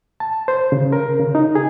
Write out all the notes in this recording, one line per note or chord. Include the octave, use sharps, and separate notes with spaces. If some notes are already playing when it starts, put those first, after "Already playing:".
A5
C5
C#3
A#4
C#3
D#4
G#4